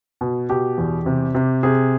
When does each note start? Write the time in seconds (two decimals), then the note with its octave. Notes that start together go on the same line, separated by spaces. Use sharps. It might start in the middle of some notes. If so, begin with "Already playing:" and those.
0.21 B2
0.50 B2 G4
0.78 E2
1.06 C3
1.35 C3
1.63 C3 G#4